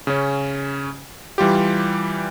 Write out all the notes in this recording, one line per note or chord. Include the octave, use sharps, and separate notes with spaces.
C#3 C#4
E3 G3 F4 G4